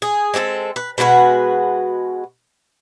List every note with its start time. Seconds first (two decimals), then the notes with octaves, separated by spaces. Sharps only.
0.02 G#4
0.34 G#3 C4 G#4 A4
0.76 B4
0.98 B2 G#3 F#4 B4